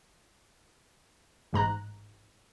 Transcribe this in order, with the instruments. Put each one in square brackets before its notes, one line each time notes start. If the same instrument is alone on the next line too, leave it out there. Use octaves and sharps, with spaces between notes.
[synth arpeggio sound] A1 G#2 A#5 F#6